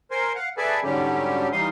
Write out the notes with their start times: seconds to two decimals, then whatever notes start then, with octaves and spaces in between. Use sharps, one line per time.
0.11 A#4 C5 G#5 C6
0.35 F5 F#5
0.57 G#4 A4 B4 D5 E5 G#5
0.84 G#2 D3 F#3 G3 C#4 G4
1.52 E3 G3 D#4 F5 C6 D#6